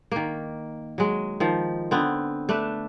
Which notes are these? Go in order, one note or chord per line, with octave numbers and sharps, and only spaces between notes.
D#3 A#3
F#3 G#3
D#3 F3
D3 B3 C4
A3 D4 B4